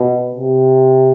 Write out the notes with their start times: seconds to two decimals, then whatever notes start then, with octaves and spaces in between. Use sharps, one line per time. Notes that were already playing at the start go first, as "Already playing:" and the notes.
Already playing: B2
0.35 C3